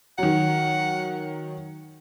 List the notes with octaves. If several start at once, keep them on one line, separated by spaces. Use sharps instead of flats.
D#3 F#3 F#5